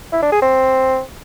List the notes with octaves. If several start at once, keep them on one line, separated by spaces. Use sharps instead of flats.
E4
D4
G#4
C4